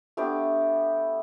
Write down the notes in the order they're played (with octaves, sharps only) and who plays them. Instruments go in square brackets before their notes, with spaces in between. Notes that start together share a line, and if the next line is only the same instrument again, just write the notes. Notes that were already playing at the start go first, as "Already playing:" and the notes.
[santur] A3 B3 D4 G4